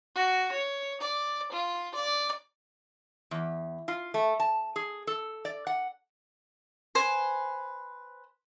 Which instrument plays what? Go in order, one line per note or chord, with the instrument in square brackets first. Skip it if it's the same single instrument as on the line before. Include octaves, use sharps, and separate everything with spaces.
[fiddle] F#4
C#5
D5
F4
D5
[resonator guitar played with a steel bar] E2
F4
A3
A5
G#4
A4
D5
F#5
[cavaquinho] B4 C5 G#5